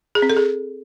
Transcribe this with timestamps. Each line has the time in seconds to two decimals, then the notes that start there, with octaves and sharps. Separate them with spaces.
0.15 G#4
0.22 C4
0.30 A4
0.37 G#4